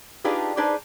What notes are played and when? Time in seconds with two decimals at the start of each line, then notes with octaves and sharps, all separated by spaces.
0.24 D4 D#4 F4 G4 G#4 B4
0.57 D4 D#4 G#4 B4 C5 D5